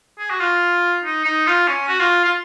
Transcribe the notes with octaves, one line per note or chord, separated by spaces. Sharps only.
G#4
F#4
F4
D#4
D#4
F4
C#4
F#4
F4
F4